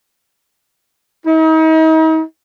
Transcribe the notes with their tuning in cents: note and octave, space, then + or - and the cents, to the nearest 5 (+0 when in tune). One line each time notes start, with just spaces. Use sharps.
D#4 +40